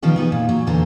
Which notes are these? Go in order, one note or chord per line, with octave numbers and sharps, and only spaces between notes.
B2 D#3 F3 C#4 F4 G4
B3 D#4 G4 G#4
A#2
F#3
E2 A#2 D3 C5 A#5